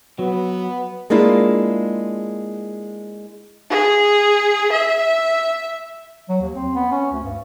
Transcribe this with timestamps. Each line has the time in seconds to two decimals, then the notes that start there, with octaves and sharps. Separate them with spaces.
0.19 F#3 B3
1.10 G#3 A#3 D4 E4 F4
3.70 G#4
4.72 E5
6.29 F#3
6.41 D#2
6.55 C4
6.75 B3
6.92 C#4
7.12 D2
7.23 G2